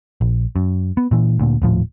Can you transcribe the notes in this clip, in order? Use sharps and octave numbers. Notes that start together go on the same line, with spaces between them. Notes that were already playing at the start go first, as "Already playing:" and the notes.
A#1
F#2
B3
A#2 E3
D2 A#2
D#1 A2 F3